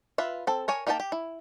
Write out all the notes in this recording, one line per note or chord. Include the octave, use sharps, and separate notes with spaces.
F4 B4 E5
C4 A4
A#4 C#5 G#5
A#3 D#4 G4 G5 A5
G4
E4